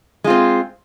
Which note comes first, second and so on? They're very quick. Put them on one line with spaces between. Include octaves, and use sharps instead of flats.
G#3 F4 C4